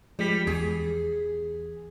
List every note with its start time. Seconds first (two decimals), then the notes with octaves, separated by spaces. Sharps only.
0.19 F3 G3 G#3 B6
0.47 E2 G#4